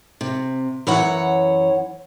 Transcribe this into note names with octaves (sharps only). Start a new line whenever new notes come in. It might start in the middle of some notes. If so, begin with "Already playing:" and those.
C3
F#2 E3 C#5 F#5